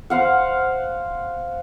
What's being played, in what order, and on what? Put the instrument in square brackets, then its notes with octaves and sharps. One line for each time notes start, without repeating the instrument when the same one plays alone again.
[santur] C5 F5 F#5